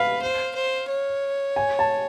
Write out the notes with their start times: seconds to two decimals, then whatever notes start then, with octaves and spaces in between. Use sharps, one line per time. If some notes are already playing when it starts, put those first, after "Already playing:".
Already playing: B4 F5
0.22 C5
0.55 C5
0.89 C#5
1.56 G#5
1.79 A5